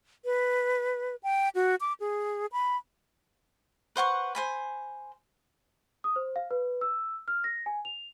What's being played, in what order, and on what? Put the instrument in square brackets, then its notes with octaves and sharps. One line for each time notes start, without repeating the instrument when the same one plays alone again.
[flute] B4
G5
F#4
D6
G#4
B5
[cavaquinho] B4 C5 F#5 C#6
C5 G#5 B5
[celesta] D#6
C5
F5
B4
E6
F6
A#6
G#5
F7